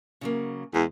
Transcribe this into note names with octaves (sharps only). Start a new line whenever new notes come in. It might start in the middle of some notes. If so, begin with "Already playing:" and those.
C#3 F#3 A#3
E2 G#3